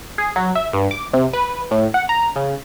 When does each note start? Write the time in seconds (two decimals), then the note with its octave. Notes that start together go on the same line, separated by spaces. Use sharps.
0.18 G#4
0.36 F#3
0.55 E5
0.73 G2
0.91 D6
1.13 C3
1.33 B4
1.71 A2
1.94 F#5
2.09 A#5
2.36 C#3